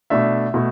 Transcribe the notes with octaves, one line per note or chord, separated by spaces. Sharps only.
B2 A3 D4 E5
B2 A3